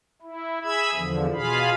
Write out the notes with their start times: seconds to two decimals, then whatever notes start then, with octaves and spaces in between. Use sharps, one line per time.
0.22 E4
0.64 G#4 E5 B5 E6 G#6
0.94 E2 D3 F3
1.34 B2 F4 G#4 F5 B5